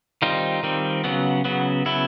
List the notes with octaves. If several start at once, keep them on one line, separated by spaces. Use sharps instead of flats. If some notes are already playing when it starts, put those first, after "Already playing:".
D#3 G3 C4 D#4 F4
D#3 G3 C4
C#3 F#3 B3
C#3 F#3 B3
C#3 F#3 B3 E4